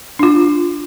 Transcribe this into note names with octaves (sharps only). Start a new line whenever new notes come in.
D4 F4